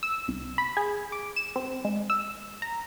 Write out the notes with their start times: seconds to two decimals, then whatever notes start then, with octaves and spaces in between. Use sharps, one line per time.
0.03 E6
0.28 C2
0.58 B5
0.77 G#4
1.12 D6
1.36 E7
1.56 C4
1.85 G#3
2.10 E6
2.62 A#5